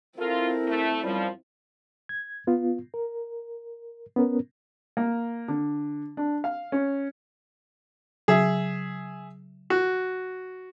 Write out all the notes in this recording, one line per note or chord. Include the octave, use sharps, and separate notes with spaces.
C4 E4 F4 A4 A#4
A3
F#2 F3 G3
G#6
B3 F4
A#4
B3 C#4 A#4
A#3
D3
D4
F5
C#4
C#3 F#3 G#4 E5
F#4